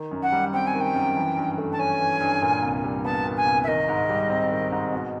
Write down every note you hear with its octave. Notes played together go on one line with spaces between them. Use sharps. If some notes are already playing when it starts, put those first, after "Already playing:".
Already playing: D#3
F#2
F#5
G3
C4 G5
G#5
D#3
G5
F#2
E3
G2
A3
A5
C#4 G#5
E3
G2
A#2
C2
G3
B3 A5
A#2
G#5
C2
E5
D#3 D#5
G#2
G3
C4
D#3
G#2
B2